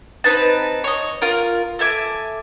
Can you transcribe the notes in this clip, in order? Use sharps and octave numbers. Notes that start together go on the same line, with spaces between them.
C4 D#4 B4 A5
C#5 D#5
F4 A#4
A4 E5 G#5 D6